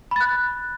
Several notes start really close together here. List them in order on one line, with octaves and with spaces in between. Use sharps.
B5 A6 F#6